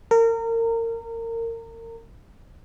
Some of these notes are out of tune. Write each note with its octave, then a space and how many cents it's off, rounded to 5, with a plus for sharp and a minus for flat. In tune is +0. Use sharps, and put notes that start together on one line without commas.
A#4 -30